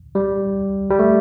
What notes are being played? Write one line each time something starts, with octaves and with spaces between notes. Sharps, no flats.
G3
G3
A3